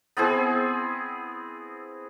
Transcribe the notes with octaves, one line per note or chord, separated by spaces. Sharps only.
B3 C4 E4 G#4